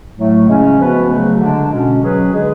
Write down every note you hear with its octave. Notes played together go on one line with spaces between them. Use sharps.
A2 F#3 A3
C#3 G#3 C#4
F3 B3 F#4 B4
C#3 F#3 A3
D3 G#3 D4
B2 G#3 C#4
F#3 C#4 G#4 B4
D3 G#3 D4 G#4 B4